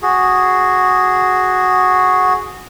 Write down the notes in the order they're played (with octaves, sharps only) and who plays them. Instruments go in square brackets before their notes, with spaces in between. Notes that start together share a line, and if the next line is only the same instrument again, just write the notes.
[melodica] F#4 G#4